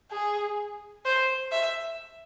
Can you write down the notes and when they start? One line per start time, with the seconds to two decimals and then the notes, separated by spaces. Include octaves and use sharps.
0.11 G#4
1.05 C5
1.52 E5